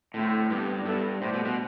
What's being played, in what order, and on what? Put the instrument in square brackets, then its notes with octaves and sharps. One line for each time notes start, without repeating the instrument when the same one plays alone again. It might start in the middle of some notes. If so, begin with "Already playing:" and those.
[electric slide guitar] A2 [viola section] D3 A3 C4 E4 A4
[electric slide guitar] G2 [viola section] B3 D4 G4
[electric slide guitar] G2 [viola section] G3 B3 E4 A4
[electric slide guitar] A2 [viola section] A3 D4 G4 C5
[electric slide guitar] B2
B2